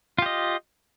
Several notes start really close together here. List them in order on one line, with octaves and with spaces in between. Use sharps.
F4 G4 D#5